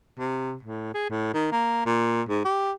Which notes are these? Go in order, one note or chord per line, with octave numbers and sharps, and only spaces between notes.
C3
A2
G#4
A2
D#3
A#3
A#2
G#2
G4